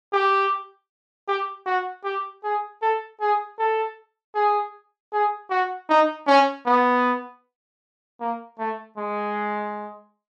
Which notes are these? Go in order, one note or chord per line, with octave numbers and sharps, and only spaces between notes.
G4
G4
F#4
G4
G#4
A4
G#4
A4
G#4
G#4
F#4
D#4
C#4
B3
A#3
A3
G#3